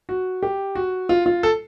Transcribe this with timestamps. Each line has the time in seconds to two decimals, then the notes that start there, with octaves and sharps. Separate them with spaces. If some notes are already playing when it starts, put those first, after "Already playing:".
0.09 F#4
0.43 G4
0.75 F#4
1.09 F4
1.26 F4
1.43 A4